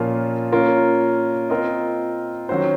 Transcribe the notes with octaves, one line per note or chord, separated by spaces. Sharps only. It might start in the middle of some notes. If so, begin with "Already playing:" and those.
Already playing: A#2 F3 A#3 C#4 F4
A#3 C#4 F4 A#4
C4 F4 A#4 D#5
D#3 F#3 C#4 F#4 C5